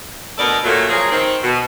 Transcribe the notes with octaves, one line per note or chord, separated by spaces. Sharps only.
D2 B2 B3 A4 A#4 D5
A#2 F#3 A3
F3 F#3 A#3 G#4
D#3 C4
B2